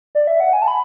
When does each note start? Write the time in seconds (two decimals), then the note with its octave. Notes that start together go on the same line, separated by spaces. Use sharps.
0.15 D5
0.27 E5
0.40 F#5
0.53 G#5
0.62 A5
0.68 B5